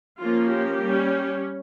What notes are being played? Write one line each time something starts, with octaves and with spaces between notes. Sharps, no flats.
F3 A#3 C#4 F4
G4
G3 C#4